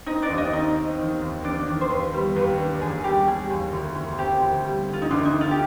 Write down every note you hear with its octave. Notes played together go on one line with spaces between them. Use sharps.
C4 D#4 D#5
D4 D5
D#2
D#4 D#5
C4 D#4 D#5
C4
D#3
D#2
D#3 D4 D5
D#3
C5
D#2 B4
G3
D#2 B4
D4
D#2 G#4
G3 G4
G3 G#4
D#2
D2
D2
C4 G4
D2
G3
D3
F4
D#4
D2 D4
D#4
D3
F4
G4